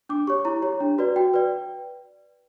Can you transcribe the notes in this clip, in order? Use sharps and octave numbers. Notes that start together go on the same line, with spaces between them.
D4 D6
G4 C#5 C#6
E4 A#5
G4 C#5
D4
F#4 B4 D5
F#4 G5
B4 D5